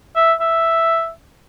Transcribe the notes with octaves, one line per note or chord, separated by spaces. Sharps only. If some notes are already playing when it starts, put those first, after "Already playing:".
E5
E5